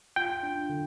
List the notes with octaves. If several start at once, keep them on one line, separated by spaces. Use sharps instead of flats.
F4 G5
D4
D3